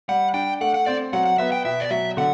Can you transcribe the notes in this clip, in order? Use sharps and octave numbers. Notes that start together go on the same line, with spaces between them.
G3 F#5
D4 G5
A3 F#5
F#5
C4 D5
F#3 F#5
F#5
B3 E5
G5
B2 E5
D5
F#3 E5
D3 F#5